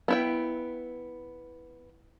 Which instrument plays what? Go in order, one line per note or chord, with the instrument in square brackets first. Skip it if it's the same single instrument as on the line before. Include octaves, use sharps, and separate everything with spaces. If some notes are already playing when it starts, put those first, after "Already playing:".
[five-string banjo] B3 E4 G5